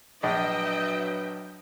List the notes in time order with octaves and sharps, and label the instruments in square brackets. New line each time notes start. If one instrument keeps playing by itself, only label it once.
[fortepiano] A#1 [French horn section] F#3 D4 B4 [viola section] D#5 E5 G5